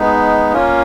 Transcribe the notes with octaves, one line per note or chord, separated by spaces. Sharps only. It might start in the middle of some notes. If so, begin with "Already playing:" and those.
Already playing: G#3 B3 D#4
A#3 C#4 F4